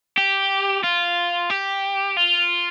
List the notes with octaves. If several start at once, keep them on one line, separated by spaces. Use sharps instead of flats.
G4
F4
G4
F4